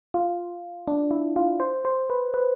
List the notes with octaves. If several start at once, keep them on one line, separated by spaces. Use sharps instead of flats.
F4
D4
E4
F4
C5
C5
B4
B4